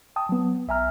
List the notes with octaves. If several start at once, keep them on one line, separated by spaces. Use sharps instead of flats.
G5 A5 D#6
F#3 B3
B1 E5 G#5 A#5 F6